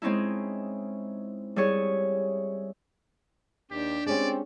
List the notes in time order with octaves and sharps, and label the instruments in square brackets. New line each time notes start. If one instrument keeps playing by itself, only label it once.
[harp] G#3 C4 C#4 D#4 E4
G3 E4 G#4 C#5
[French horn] D#2 [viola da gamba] D4 [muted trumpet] G4
[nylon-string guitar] G#3 C#4 G4 [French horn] C4 [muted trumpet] D5